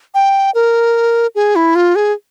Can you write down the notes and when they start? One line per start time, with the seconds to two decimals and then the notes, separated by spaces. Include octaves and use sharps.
0.14 G5
0.55 A#4
1.35 G#4
1.56 E4
1.75 F4
1.96 G#4